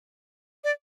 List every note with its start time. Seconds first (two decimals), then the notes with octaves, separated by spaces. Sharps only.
0.64 D5